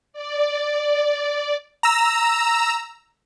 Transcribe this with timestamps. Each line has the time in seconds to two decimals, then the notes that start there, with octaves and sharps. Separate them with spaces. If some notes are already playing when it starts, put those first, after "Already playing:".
0.13 D5
1.83 A#5 E6